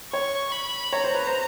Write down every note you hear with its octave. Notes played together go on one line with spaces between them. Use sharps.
C#5 C#6
B5
C#5 A#5
C5
B4
C5